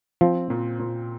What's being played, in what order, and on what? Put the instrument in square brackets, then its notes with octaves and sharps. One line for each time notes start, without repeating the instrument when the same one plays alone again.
[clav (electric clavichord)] F3 [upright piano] C4
[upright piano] A#2
A#2